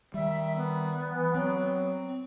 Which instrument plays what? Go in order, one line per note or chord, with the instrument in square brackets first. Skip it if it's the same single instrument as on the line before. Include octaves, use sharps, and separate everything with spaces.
[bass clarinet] D#3 [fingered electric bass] G3 [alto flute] E5
[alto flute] B3
[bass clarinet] E3
[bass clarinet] F#3 [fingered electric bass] C4